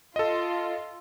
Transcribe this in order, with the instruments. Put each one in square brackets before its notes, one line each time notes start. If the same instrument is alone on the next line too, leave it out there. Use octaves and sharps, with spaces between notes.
[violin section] F4 [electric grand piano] A4 D#5